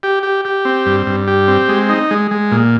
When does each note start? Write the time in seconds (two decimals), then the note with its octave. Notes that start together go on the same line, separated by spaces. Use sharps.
0.03 G4
0.23 G4
0.45 G4
0.65 C4
0.86 G2
1.06 G2
1.27 G4
1.48 C4
1.69 G#3
1.89 D#4
2.11 G#3
2.31 G#3
2.51 A#2